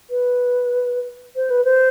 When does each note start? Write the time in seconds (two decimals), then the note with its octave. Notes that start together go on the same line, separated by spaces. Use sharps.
0.10 B4
1.36 C5
1.50 B4
1.65 C5